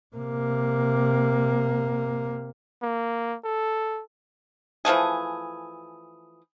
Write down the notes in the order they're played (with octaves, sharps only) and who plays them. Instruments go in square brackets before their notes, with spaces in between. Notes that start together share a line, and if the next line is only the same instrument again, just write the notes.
[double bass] C3 A#3
[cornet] A#3
A4
[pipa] E3 F3 A3 G#4